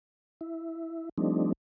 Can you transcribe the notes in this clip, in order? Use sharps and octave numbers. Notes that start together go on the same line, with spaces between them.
E4
F3 G3 A3 C4 D4 D#4